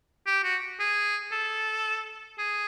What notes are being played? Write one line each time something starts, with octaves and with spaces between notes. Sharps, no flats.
G4
F#4
G#4
A4
G#4